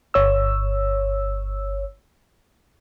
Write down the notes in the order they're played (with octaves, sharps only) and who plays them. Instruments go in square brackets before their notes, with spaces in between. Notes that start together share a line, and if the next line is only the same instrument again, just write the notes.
[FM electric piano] G1 C#5 E6